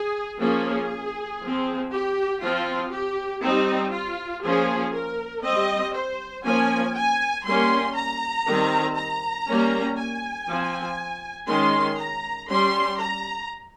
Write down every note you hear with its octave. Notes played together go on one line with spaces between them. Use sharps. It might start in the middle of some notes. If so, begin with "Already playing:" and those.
Already playing: G#4
F3 A#3 C#4 G#4
F3 C4
G4
F3 C4 F4
G4
G3 C4 D#4
F4
F3 A#3 C#4 G#4
A#4
G3 C4 D#5
C5
F3 A#3 C#4 G#5
G#5
G3 A#3 C#4 C6
A#5
D#3 G3 C4
A#5
G3 A#3 C#4
G#5
F3 C4
D#3 G#3 C#4 C6
A#5
G3 C#4 C6
A#5